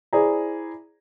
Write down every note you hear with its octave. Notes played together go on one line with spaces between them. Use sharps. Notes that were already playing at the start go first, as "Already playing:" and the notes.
E4 G#4 C5 D5 G#5 A#5